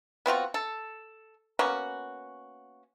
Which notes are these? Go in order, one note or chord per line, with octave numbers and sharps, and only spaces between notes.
B3 C4 F4 F#4
A4
A#3 B3 C#4 F#4